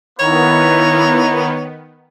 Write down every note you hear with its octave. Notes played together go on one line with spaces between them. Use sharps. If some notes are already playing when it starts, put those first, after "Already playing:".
D#3 A#3 B3 E4 B4 C#5 A#5